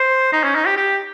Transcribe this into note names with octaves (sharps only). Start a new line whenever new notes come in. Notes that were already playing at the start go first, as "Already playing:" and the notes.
Already playing: C5
D#4
C#4
D#4
G4
G4